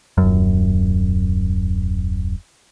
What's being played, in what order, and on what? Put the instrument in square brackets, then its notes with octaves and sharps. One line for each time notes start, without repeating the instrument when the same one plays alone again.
[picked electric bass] D#1 F#2